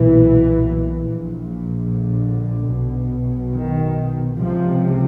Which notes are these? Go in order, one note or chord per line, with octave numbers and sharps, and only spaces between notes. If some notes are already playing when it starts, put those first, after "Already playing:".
Already playing: B1 A#2 E3
A#1 A#2
D3
B1 B2
D#3
C#2 C3 F3